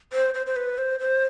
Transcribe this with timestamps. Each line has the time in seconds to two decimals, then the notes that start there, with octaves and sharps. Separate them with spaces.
0.13 C5
0.34 C5
0.46 C5
0.56 B4
0.78 C5
1.00 C5